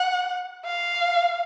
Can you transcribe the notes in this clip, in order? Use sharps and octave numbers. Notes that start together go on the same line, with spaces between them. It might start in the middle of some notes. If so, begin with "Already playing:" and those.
Already playing: F#5
F5